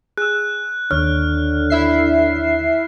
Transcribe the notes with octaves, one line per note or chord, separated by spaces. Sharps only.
G#4 E6 F#6
D#2 D3 C#5 F6
E4 E5 C7